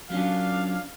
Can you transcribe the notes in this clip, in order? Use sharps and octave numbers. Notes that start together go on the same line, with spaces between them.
F#3 C#4 D4 F4 F5